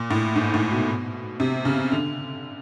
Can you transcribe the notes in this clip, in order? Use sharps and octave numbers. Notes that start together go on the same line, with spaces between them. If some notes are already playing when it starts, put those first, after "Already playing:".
Already playing: A#2
A2
G#2
A2
B2
C3
C#3
D3